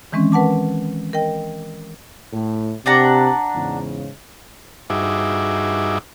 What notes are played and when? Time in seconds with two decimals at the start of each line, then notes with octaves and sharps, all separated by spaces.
0.12 D#3 E3 G#3 C4 C#4
0.32 A#4 B4 F#5 A5 D6
1.13 A#4 D#5 G5
2.33 A2
2.86 C3 D4 G4 F#5 A#5
3.54 E2 G#2 C#3
4.90 G2 D#4 F#4 G#4 E5 D6